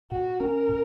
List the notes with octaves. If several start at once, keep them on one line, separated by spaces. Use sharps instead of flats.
A#2 F#4
C#4 A#4
A#2